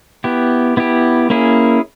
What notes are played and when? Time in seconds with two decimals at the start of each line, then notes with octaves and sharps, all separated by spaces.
0.24 B3 E4 G4
0.77 B3 E4 G4
1.30 A#3 C#4 E4 G#4